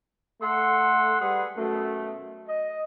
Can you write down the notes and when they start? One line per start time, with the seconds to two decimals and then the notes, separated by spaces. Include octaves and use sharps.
0.41 A3 A4 F#5 C6
1.20 G3 G#4 B4 F#5
1.57 F#2 B2 A3
2.49 D#5